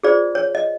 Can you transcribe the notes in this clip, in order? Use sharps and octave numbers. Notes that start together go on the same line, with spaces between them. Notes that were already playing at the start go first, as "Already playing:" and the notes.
F4 G#4 C5 D5
C#5
D#5